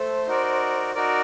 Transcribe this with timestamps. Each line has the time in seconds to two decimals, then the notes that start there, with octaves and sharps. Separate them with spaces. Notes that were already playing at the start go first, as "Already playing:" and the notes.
Already playing: A3 A4 C5
0.27 D#4 F#4 A#4 D5
0.94 D#4 F#4 A#4 D5